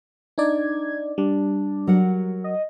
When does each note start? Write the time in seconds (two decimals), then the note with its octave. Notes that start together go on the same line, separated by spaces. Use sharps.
0.38 D4 D#4 D5 G#6
1.18 G3 D4
1.87 F#3 A#4 F#5
2.44 D#5